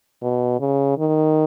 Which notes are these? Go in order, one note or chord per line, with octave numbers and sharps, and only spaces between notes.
B2
C#3
D#3